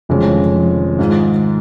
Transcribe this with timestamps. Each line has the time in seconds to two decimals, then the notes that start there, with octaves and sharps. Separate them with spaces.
0.09 F1 F2 C#3 F3 G#3 C#4
0.31 D#3
0.54 F3
0.77 D#3
0.99 G#2 G#3 F4 G#4